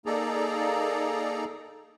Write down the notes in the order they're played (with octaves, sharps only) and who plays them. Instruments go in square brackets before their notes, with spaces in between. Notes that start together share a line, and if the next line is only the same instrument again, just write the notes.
[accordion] A#3 D#4 G#4 A4 D5 A#5